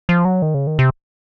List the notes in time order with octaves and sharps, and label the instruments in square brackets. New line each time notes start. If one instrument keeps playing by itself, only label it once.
[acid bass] F3
F#3
D#3
C#3
D#3
C3